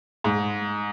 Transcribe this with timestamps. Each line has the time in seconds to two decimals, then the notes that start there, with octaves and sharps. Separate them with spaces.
0.24 G#2